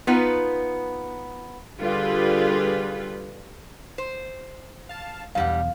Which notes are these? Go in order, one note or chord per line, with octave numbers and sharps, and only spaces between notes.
B3 D#4 F4 B4
D3 G3 F4 G#4 B4
C5
F5 A5
B1 E2 G2 G3 F5 F#5